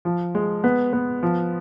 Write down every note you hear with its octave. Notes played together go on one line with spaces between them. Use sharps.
F3
G#3
B3
B3
F3